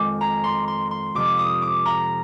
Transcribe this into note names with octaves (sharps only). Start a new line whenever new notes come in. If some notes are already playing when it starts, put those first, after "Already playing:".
Already playing: F2 D#3 G#3 G#5 D6
A#5
C6
C6
C6
F2 C3 F3 D6
D#6
D6
A#5